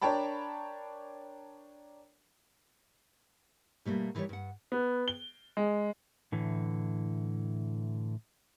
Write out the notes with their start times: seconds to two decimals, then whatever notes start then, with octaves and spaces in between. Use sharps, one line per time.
0.02 D4 A#4 C#5 G5 A5 B5
3.85 B2 G3 A3 A#3
4.15 D#3 E3 G3 G4 C#5
4.29 G2 F#5
4.72 B3
5.08 G7
5.57 G#3
6.32 A2 D3 E3